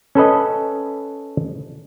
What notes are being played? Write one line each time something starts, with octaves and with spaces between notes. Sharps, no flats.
C#4 A4 B4 D#5